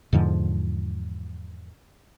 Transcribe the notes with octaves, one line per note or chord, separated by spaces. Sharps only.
E2 G#2 D3 F3